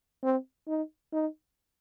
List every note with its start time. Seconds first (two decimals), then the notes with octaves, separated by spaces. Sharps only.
0.23 C4
0.68 D#4
1.13 D#4